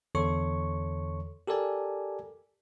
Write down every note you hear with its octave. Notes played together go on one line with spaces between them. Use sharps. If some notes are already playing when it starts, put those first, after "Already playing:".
E2 D3 A4 C#5 C6 C#6
G4 A4 A#4 D5 G#5